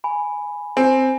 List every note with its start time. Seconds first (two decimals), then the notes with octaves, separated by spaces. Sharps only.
0.04 G#5 B5
0.77 C4 G#5